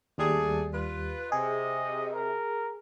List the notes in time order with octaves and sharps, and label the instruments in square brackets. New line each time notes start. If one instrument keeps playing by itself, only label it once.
[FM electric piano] D#2 G3 [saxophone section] A3 D4 G#4
[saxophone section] F4 B4
[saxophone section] C3 [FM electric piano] G#4 [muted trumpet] D#5
[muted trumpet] A#4